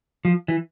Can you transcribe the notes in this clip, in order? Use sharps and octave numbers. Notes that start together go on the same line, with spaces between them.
F3
E3